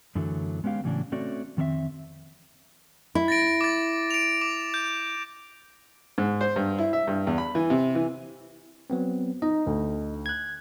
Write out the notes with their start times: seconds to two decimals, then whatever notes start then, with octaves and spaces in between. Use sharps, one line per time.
0.15 F#2 D3 E3 F#3 A3
0.64 G#3 B3 C#4 G4 F5
0.84 A2 C#3 E3 F#3 C#4 D4
1.12 A3 C4 C#4 F#4 C#5 D5
1.57 F2 D#3 C4 D4 E5
3.15 E4
3.28 A6 A#6 D7
3.61 D6 A6
4.11 D7 F7
4.41 D6
4.74 G6
6.18 G#2
6.41 C5
6.56 G2
6.78 E4
6.93 E5
7.08 G2
7.27 E2
7.38 B5
7.55 E3
7.70 C3
7.95 E3
8.90 F#3 B3 C4
9.42 D#4 D#5
9.67 D2
10.26 F#6 G#6